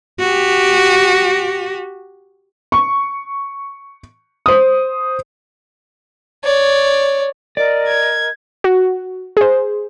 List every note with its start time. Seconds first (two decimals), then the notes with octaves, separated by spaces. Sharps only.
0.19 F#4 G4
2.72 C#6
4.46 C5 D#6
6.44 C#5 D5
7.57 A#4 D5 D#5
7.88 G#6
8.64 F#4
9.37 G#4 C5